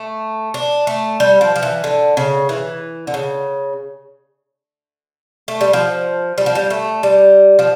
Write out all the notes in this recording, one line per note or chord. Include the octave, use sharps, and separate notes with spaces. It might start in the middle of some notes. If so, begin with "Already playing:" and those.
Already playing: A3
D4
A3
G3
F3
F3
E3
D3
C#3
E3
D3
C#3
A3
G3
F3
G3
F3
G3
A3
G3
F3